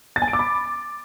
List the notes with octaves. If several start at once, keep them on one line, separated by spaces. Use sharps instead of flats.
A6
G#5
D7
D6
B5